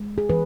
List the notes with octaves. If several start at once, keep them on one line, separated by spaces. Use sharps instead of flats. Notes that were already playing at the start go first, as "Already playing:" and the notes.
Already playing: G#3
G#4
E3 B4